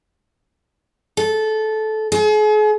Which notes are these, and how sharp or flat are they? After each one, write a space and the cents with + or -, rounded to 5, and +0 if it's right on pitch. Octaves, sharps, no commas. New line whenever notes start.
A4 -15
G#4 +40